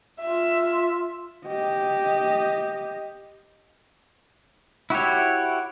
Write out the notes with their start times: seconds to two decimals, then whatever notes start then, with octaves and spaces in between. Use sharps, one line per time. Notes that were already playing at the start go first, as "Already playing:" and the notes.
0.21 F4 E5
1.46 G4 D#5
4.90 E4 F#4 G4 C#5